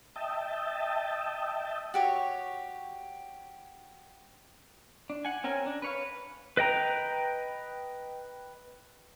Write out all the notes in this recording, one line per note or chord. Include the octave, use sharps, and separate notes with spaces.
D#5 E5 G5 A5
F#4 G4 C#5
D4
F#5 G#5
C4 C#4 A#4 G#5
D4
B4 C#5 F5
B4 D#5 G5 A#5